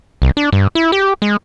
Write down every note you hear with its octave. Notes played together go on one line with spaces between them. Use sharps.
C2
D4
G2
E4
G4
G#3